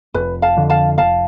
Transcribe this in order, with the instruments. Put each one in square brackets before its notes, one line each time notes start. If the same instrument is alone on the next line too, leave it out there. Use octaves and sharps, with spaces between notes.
[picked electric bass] F1 [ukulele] B4
[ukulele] F5 A5
[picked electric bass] F2 D3
[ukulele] F5 A5
[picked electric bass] F1 [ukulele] F5 A5